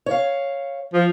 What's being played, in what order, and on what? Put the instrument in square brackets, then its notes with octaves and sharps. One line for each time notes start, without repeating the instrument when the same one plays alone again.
[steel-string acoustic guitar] C#5 F5
[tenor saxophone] F3